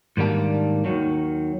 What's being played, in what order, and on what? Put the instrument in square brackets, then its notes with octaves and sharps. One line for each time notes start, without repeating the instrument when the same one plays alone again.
[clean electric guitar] G#2 D#3 G3 A#3 D4
D#2 D#3 F#3